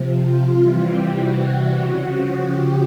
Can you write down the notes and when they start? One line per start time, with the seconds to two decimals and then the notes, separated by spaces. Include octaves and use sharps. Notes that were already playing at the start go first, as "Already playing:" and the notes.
Already playing: C3 F3
0.19 F4
0.51 C3 E3 G3
0.84 G4
1.15 F#4
1.47 F#4
1.78 C#3 F3
2.42 G4